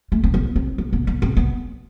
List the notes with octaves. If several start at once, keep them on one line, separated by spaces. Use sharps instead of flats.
A3
C4
B3
C4
B3
B3
B3
C4
B3